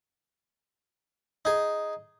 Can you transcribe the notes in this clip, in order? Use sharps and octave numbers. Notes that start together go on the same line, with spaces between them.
D#4 G#4